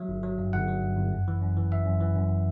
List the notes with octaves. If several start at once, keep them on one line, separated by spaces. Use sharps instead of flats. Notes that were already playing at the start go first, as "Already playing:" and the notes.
Already playing: F#3 E5
G1
F#3
G2
G1 F#5
F#3
G2
G1
F#2
E3
F#2
E3
E3 E5
F#2
E3
F#2